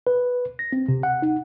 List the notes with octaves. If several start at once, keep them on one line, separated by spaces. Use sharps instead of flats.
B4
A#6
C4
C3
F#5
D#4